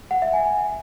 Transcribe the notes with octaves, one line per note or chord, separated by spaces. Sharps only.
F#5
E5
G#5